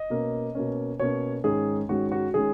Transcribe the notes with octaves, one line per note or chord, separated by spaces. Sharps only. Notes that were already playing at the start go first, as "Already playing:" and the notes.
Already playing: D#5
B2 A#3 C#4
B2 A#3 C#4
B2 A#3 C#4 C#5
G#2 D#3 G#3 C#4 G#4
G#2 D#3 G#3 C#4 F#4
F#4
D#3 G#3 C#4 G#4